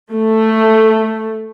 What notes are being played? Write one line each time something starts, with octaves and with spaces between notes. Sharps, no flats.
A3